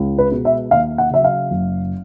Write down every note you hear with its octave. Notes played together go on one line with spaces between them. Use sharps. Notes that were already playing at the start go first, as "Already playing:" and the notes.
Already playing: C#2
B4
B2 G#3
E5
D#2 F5
F#5
C#3 F#3 E5
F5
F#1